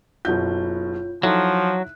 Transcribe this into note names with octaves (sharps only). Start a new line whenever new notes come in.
F#1 B2 F4 C#5 G6
F3 F#3 D#4 E4 A4 F#6